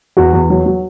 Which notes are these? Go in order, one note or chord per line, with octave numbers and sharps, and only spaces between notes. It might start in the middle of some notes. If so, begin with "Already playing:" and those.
E2 F#4
E2
F#3
F#3